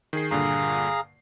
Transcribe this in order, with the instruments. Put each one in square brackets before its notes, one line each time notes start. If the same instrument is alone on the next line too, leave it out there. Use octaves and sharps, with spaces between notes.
[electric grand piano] D#3 G#4 C7
[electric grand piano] G2 A#2 D3 [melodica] G#4 F5 A#5